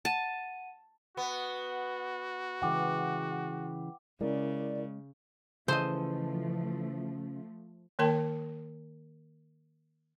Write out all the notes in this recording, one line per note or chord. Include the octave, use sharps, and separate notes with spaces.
F#5 A5 D#7
B3 F#4
C#3 E3 G#3 F#5 G5 D6
C#3 G#3 C#4 E4 A#4 D5
C#3 E3 F3 A3 A4 C5 D#5
D#3 A#3 A#4 C#5 G5 A5